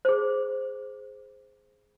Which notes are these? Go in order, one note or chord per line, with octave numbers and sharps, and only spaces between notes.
G#4 C5